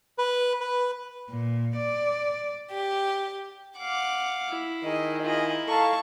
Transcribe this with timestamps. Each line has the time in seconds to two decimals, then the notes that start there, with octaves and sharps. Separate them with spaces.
0.18 B4
0.60 B4
1.29 A#2
1.76 D5
2.71 G4
3.78 F5 F#5 D6
4.49 E4
4.84 D#3 G#4 D#5 G#5
5.22 E4 F4 D#5
5.67 A4 F5 A5 A#5 C#6